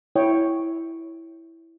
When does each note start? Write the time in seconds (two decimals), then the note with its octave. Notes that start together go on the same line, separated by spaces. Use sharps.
0.16 E4 C#5 G5